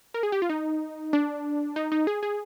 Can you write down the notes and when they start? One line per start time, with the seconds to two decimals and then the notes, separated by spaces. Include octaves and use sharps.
0.14 A#4
0.23 G#4
0.32 G4
0.42 F4
0.49 D#4
1.13 D4
1.76 D#4
1.92 D#4
2.07 G#4
2.23 G#4